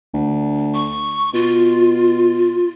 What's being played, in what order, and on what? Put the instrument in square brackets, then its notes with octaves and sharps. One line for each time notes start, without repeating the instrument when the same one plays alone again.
[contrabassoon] D2
[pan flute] C#6
[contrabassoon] B2 [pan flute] F4